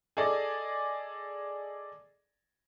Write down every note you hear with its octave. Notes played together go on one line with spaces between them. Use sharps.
G#4 A4 D5 D#5